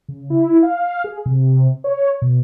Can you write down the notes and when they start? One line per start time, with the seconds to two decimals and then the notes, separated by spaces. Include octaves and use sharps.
0.08 C#3
0.30 E4
0.63 F5
1.04 G#4
1.26 C3
1.84 C#5
2.22 B2